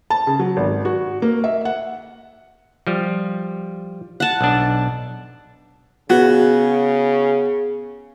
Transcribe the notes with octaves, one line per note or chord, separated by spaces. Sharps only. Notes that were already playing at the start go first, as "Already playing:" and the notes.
A5
C#3
F#3
G#1
F#4
A#3
E5
F#5
F3 G3
F#5 A5
B1 D4
C#3 B3 F#4 G#4